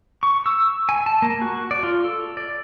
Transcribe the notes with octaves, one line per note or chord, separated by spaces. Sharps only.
C#6
E6
G#5
A5
A#3
F#4
D5
F4
A4
D5